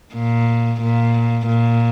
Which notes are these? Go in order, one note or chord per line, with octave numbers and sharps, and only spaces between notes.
A#2
A#2
A#2